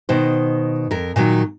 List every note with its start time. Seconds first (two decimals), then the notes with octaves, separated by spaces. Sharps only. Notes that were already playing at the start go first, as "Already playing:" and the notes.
0.09 B2 D#3 C5
0.91 F2 A#4
1.16 A#2 D#3 F#3